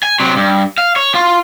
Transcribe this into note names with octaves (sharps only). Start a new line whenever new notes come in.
G#5
C3 F#3
G2
F5
C#5
F4